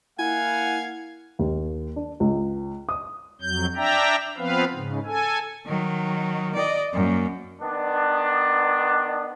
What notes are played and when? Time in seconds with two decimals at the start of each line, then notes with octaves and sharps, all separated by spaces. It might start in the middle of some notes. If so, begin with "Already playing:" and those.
0.19 A#3 E4 F5 F#5 G#5
1.39 D#2
1.96 D4
2.20 C#2
2.89 D#6
3.42 F2 F#3 G6
3.76 D4 D5 E5 G5 A#5
4.38 F3 B3 C4 B4 F5
4.74 G#2 C#3
5.06 A4 G#5
5.67 D#3 F#3
6.55 D5 D#5
6.94 F#2 A#3
7.61 D#3 B3 D4